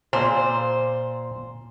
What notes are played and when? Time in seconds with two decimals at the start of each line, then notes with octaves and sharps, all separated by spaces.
0.13 A#2 C5